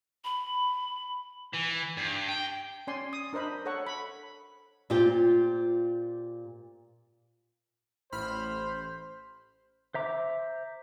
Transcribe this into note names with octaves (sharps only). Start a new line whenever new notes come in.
B5
E3
G2
G5
C#4 D5 G#5 C6
D#6
D4 A#4 C5 D#5 B5
A4 C#5 F#5 C#6
B5
A#2 C4 F4 G4
A1 C5 B5 F6
C5 E5 A#5 D6